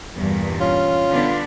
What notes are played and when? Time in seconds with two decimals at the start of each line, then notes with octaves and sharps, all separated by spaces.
0.15 E2 G2 A#2
0.60 C#4 F4
1.11 D3 B3 D4